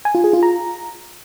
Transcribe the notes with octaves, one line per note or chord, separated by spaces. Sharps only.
G#5
F4
G#4
F4
A#5